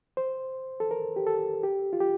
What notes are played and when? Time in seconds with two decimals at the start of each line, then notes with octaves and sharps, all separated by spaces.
0.17 C5
0.80 A4
0.91 A#4
1.16 G4
1.27 A4
1.63 G4
1.93 F4
2.00 G4